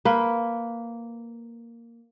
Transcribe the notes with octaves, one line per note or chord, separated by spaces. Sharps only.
A#3 B4